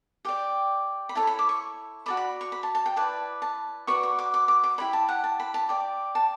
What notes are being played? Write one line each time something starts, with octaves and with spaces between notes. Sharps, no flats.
G4 D5 G5
B5
E4 A4 C#5 A5
B5
D6
C#6
F#4 A4 D5 B5
B5
C#6
B5
A5
A5
G5
E4 B4 D5 A5
A5
F#4 B4 D5 C#6
C#6
D6
D6
D6
D6
E4 G4 C#5 B5
A5
F#5
A5
B5
A5
G4 D5
A5